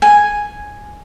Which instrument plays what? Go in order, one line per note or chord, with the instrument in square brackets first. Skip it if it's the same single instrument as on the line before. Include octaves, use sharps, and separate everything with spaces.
[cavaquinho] G#5